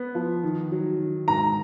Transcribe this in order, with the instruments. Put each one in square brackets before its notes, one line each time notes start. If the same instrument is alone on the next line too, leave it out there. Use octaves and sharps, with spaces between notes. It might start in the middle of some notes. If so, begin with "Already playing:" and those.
Already playing: [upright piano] B3
F3
D#3
F#3
D#3
[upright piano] G#2 [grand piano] A#5